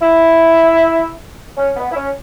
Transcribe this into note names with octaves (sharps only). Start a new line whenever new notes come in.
E4
C#4
B3
E4
C#4